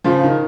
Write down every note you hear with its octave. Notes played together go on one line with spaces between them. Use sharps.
C#3 F3
D#3